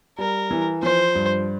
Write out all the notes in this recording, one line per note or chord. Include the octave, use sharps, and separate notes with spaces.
G3 A#4
E3
F3 C5
G2